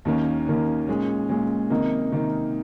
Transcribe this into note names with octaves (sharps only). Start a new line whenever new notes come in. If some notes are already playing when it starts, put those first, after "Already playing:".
D#2 D#3 A#3 C#4
D#2 D#3 A#3 C#4
A#2 G#3 C#4
A#2 G#3 C#4
C3 D#3 A#3 D#4
C3 D#3 A#3 D#4